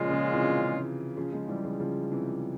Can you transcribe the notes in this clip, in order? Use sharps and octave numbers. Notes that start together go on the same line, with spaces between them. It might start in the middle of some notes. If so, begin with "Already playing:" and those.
Already playing: A#2 C#3 F3 G#3 C#4 F4
C#3 F3
C3 E3
C#3 F3
F3 G#3
E3 G3
C#3 F3
C#3 F3
C3 E3